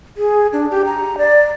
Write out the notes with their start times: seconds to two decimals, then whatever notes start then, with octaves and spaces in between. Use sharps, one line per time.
0.17 G#4
0.53 D4
0.71 G4
0.86 A#5
1.18 D5